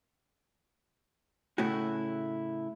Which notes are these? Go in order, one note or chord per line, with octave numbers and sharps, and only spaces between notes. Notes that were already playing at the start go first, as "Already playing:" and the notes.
A2 C#3 A3 C#4 E4 F#4